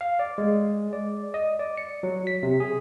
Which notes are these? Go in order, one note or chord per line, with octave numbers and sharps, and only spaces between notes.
F5
D5
G#3
D5
D#5
D5
C#7
F#3
B6
C3
G#4